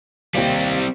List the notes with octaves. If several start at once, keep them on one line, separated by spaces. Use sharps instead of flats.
D#2 G3 C4 G4